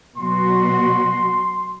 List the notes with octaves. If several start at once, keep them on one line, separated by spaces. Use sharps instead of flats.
B2 F#3 F#4 C6